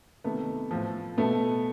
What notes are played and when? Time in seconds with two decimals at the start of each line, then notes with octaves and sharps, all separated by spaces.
0.24 C3 D#3 A3 B3
0.71 A2 F3
1.17 B2 A3 B3